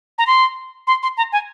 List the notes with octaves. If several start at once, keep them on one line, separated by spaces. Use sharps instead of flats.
A#5
C6
C6
C6
A#5
G#5